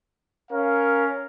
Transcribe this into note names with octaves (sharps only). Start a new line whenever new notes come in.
C#4 A#4 F5